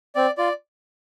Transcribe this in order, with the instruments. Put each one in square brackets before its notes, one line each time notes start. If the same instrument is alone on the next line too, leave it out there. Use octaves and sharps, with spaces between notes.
[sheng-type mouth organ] C4 D5
F4 D5